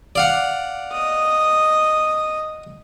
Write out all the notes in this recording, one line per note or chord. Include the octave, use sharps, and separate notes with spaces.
D5 F5 F#5
D#5 D#6